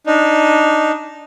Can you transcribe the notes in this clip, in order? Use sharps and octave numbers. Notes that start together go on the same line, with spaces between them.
D4 D#4